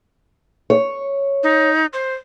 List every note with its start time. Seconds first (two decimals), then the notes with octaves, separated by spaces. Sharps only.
0.70 C#5
1.43 D#4
1.93 C5